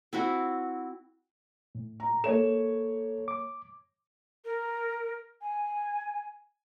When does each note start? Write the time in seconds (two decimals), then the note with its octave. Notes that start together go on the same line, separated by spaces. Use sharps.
0.13 C4 E4 F#4
1.75 A2
2.00 A#5
2.24 A#3 A4 C#5 E7
3.28 D6
4.45 A#4
5.41 G#5